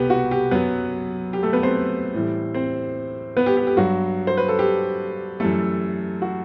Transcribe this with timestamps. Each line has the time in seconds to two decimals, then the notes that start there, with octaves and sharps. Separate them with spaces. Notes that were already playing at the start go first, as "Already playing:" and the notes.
Already playing: C2 B2 B3 G4 B4
0.10 F#4
0.31 G4
0.51 F#2 F#3 B3 B4
1.33 G4
1.43 A3 A4
1.53 B3 B4
1.63 C4 C5
2.14 A2 E3 G3
2.54 C4 C5
3.37 B3 B4
3.46 G4
3.57 G4
3.67 G4
3.77 G2 F#3 F#4
4.27 C5
4.37 B4
4.48 A4
4.59 G4
5.40 F#2 E3 G3 A3 A4
6.22 F#4